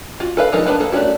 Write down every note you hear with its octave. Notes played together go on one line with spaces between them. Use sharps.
F4 F#4
A4 B4 F5
F3 G#3 D#4 A4 A#4
B3 D4 B4 C#5 A5
A#3 A4
A3 C#4 D4 E4 F#4